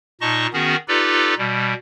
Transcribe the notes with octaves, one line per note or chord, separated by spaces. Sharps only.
A#2 D#4 D#5 A5 C#6
D#3 B3 C#4 F#4 G#4
D#4 F4 G4 A4 B4 D5
B2 G3